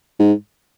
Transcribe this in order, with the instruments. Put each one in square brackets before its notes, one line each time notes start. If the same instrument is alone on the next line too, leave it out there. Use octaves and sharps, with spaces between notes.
[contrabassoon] G#2